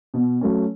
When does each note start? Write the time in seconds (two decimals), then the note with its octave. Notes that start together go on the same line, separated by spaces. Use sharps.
0.14 B2
0.41 F#3 A3 C#4